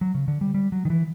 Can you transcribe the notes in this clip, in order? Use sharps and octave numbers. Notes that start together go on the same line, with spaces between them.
F#3
C#3
D3
G3
G3
F#3
D#3
E3